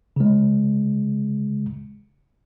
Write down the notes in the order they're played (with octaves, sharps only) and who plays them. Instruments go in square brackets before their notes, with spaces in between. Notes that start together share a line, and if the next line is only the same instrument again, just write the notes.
[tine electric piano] C#3 G#3